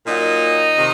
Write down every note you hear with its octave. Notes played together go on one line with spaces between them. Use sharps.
A#2 F#3 D#4
C3 D#3